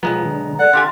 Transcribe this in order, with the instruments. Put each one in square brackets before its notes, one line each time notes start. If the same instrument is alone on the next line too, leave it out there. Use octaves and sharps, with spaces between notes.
[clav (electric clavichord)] B1 G#3 B3 [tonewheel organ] F3 [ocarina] A#5
[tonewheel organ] D3
[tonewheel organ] A4 [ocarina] D5 [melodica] F#5
[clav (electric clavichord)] D3 G4 G#5 [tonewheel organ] F5 A5 [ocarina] C6